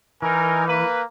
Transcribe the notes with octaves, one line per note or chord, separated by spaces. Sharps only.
E3 D#4 A#4 G#5
A#3 B4